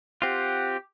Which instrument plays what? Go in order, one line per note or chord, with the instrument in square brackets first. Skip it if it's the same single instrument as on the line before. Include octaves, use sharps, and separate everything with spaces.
[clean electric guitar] C4 F4 [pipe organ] G4 [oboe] F#5